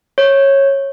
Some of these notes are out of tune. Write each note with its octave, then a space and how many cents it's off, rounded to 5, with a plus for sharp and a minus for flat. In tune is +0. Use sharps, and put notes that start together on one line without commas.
C#5 -15